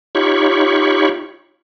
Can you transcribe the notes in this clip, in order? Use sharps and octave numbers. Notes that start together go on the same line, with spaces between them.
D#4 F4 G4 C#5 B5 C#6